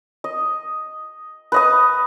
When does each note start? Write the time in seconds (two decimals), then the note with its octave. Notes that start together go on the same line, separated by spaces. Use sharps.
0.24 D#5
1.52 B4 D#5 D#6